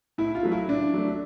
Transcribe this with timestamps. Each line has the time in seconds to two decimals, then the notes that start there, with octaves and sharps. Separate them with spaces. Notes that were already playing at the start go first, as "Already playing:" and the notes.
0.18 A2 E4
0.35 F4
0.43 F#3 A3
0.52 E4
0.68 A2 D4
0.94 F#3 A3